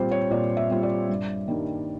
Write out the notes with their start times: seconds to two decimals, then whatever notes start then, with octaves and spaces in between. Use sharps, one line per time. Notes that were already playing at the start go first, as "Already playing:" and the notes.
Already playing: A#2 G3 C4 F4 C5
0.11 C#5
0.30 A#2 D5
0.57 E5
0.71 G3 C4 F4
0.83 D5
1.09 G2
1.48 D#3 G3 A#3 D4